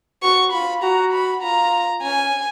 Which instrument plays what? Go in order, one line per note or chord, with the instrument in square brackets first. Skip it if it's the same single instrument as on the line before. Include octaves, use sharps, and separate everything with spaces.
[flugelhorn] F#4 [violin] C#6
[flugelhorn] F4 [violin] B5
[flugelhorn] F#4 [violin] A#5
[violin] B5
[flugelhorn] F4 [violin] A#5
[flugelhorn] C#4 [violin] G#5